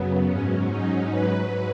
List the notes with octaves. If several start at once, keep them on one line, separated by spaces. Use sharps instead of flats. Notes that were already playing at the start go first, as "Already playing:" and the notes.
Already playing: F#2 C#3 F#3 B3
G#2 F#3 C#4
D#4
G#2 F#3 B4